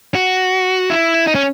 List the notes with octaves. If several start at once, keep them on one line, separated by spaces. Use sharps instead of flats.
F#4
E4
D#4
C#4